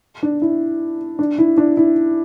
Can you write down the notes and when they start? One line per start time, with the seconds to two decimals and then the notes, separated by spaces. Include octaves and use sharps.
0.23 D4
0.42 E4
1.19 D4
1.38 E4
1.58 D4
1.77 E4